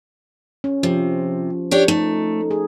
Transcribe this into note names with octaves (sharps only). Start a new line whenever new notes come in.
C#4
C3 F3
D4 G4 C#5
A3 D#4
G#4